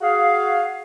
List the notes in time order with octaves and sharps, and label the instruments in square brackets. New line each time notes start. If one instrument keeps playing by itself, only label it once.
[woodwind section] F#4 G#4 F5